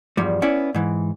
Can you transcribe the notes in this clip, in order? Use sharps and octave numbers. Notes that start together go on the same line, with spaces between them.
E2 G2 F3 G3
B3 C#4 E4 D5
G#2 E3